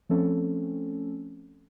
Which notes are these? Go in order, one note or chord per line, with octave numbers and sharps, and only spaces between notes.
F3 A3 C4 C#4 A4